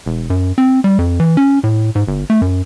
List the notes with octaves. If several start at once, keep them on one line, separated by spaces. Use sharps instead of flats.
E1
F#2
C4
G3
F2
E3
C#4
A2
G#2
G1
A3
F#2